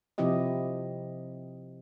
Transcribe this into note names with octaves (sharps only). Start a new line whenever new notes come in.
C3 F3 C4 E4 G4 D#5